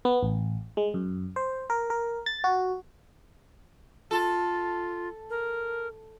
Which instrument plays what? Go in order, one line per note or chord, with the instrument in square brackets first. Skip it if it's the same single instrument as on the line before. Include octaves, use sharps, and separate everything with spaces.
[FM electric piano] B3
A1
G#3
F#2
C5
A#4
A#4
A6
F#4
[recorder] F4 [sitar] A4
[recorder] A#4